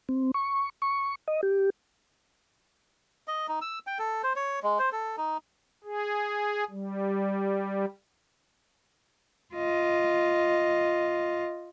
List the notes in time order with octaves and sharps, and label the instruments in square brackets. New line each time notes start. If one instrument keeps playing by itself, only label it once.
[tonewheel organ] C4
C#6
C#6
D#5
G4
[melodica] D#5
D#4
E6
G5
A4
C5
C#5
G#3
C5
A4
D#4
[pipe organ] G#4
G3
[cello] F4 D#5